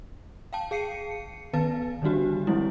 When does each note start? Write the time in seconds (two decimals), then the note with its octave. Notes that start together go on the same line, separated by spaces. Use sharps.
0.53 F5 G5 A5
0.71 G#4 F5 C7 C#7 D#7
1.11 C#7
1.53 D#3 B3 B4 F5 A5 A6
2.02 D3 D#3 G3 D4 F#4 G4
2.47 E3 F3 G3 G#3 C4 E4